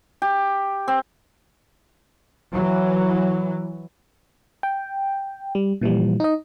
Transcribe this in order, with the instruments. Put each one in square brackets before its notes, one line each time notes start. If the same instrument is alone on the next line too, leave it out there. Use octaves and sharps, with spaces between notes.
[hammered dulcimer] G4
C4
[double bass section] E3 F#3
[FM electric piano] G5
G3
A#2 E3 F3 G3
D#4 D#5